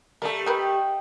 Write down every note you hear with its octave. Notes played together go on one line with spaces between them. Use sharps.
G3 A3 A4 A#4
G4 A#4 B4 D#5 G5